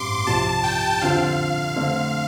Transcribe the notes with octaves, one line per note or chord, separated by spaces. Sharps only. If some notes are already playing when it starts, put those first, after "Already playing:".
Already playing: A1 G2 G3 C4 C6 D6
C2 C3 F3 A5
G5
F2 D3 F3 C4 F4 F5
F2 D3 A3 C4